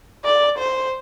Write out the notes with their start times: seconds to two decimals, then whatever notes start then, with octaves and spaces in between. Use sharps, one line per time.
0.25 D5
0.59 C5